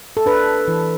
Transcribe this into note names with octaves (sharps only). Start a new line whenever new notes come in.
A4
D4 B4
E3